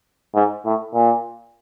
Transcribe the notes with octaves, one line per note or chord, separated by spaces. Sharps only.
G#2
A2
A#2